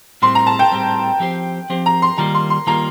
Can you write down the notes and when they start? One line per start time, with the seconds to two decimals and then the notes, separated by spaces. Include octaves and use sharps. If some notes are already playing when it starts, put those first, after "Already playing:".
0.22 A2 G3 C4 C6
0.35 A#5
0.47 A5
0.59 G5
0.71 A2 G3 C4
1.20 F3 C4 G4 C5
1.70 F3 C4 G4 C5
1.86 A#5
2.02 C6
2.18 D#3 G3 A#3 F4 A#5
2.34 C6
2.50 C6
2.67 D#3 G3 A#3 F4 A#5